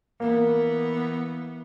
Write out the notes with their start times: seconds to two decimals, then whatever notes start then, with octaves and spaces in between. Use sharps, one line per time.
0.20 E3 A#3 B3